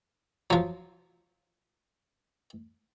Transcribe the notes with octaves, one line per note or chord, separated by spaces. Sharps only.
F3 F#3